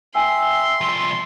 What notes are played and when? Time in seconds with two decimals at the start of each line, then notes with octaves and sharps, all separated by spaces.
0.15 E5 G5 G#5 C6
0.81 C2 F3